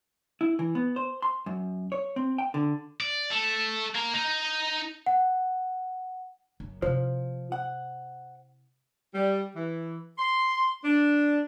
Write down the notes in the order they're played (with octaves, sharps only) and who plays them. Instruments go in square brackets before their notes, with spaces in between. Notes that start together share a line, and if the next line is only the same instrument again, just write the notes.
[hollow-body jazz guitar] E4
E3
B3
C5
C6
F#2
C#5
C4
G5
D3
[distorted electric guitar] D5
A3
A#3
D#4
[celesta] F#5
[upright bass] F#1 F#2
[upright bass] C3 E4 [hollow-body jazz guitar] F3 [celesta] C5
[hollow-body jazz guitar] F#5
[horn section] G3
E3
C6
D4